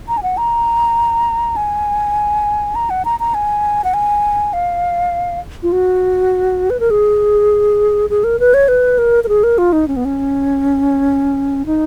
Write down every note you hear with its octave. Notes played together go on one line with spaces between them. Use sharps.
A#5
G#5
F#5
A#5
G#5
A#5
F#5
A#5
A#5
G#5
F#5
G#5
F5
F4
F#4
B4
A#4
G#4
G#4
A#4
B4
C#5
B4
A#4
A#4
G#4
A#4
F4
D#4
C#4
B3
C#4
D#4